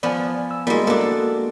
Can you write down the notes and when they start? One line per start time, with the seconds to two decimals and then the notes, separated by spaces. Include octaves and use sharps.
0.03 F3 B3 D5 G#5
0.51 E6
0.67 G3 G#3 A#3 E4 F#4
0.87 G#3 A#3 D4 F#4 A4